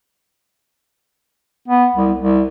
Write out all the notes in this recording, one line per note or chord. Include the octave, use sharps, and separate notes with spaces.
B3
C2
C2